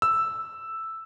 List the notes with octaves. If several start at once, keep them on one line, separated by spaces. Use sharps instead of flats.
E6